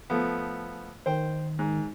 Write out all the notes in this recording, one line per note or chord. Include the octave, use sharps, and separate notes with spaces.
F3 A3 B3
D#3 C5 G5
G#2